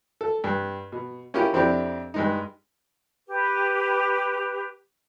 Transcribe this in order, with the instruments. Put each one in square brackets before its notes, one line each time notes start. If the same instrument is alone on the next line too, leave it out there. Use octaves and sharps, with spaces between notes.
[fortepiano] A4
G2
B2
C#4 E4 F4 G4 A#4
F2 C4 D4 E4 G4
G2 G#3 D#4
[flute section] G4 B4